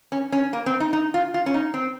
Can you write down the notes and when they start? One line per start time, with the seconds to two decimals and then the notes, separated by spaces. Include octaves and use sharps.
0.12 C#4
0.32 C#4
0.53 A#3
0.66 C4
0.80 D#4
0.93 D#4
1.14 F4
1.34 F4
1.46 C#4
1.54 D#4
1.74 C4